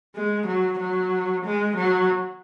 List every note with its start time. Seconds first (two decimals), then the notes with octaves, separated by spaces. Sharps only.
0.16 G#3
0.48 F#3
0.80 F#3
1.45 G#3
1.77 F#3